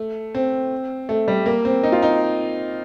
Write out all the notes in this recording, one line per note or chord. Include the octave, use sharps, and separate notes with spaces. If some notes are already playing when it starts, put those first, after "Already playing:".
Already playing: A3
C4
A3
G3
A#3
C4
D#4
F4
D#4